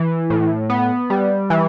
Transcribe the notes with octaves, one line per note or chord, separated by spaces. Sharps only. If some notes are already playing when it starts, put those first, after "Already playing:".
Already playing: E3
A2
B3
G3
E3